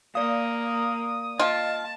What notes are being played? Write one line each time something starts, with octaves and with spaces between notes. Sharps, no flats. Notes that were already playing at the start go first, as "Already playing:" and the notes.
A#3 D5 F5 D#6
F4 D#5 F5 A5